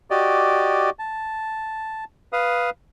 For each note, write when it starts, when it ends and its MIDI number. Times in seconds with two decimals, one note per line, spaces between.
0.11 0.90 66
0.11 0.90 67
0.11 0.90 74
0.11 0.90 75
0.99 2.04 81
2.33 2.70 71
2.33 2.70 77
2.33 2.70 87